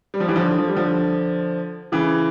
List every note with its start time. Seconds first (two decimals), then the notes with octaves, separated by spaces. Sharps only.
0.14 G3
0.20 F3
0.28 E3 G3
0.36 D3 F3
0.59 F3
0.68 G3
0.76 D3 F3
1.92 C#3 E3